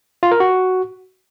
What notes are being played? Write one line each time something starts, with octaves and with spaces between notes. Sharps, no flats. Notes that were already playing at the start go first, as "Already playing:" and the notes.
F4
A#4
F#4